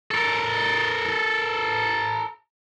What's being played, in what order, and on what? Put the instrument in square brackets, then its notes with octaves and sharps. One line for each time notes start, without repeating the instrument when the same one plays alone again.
[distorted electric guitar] A4 A#4